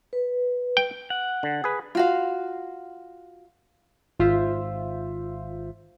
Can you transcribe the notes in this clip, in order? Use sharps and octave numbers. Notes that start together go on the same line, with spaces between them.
B4
G5
F#5
D3
G#4 B4
F4 F#4 F5
G#1 F4 C5 E5